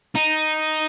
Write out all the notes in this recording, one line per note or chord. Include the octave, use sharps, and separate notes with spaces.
D#4